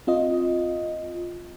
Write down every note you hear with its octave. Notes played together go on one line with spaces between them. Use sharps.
C4 F4 D#5